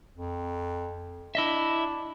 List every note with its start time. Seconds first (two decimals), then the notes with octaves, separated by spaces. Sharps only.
0.17 F2
1.35 D4 E4 D#5 E5